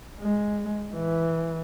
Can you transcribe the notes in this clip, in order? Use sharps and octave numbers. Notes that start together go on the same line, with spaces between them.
G#3
E3